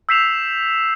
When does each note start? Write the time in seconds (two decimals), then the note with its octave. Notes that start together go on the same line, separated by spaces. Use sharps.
0.09 E6 G6 B6 C7 E7 F7